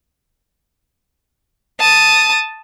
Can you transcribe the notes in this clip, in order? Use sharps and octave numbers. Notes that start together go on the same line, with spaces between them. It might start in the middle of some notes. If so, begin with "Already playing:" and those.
A5 D#6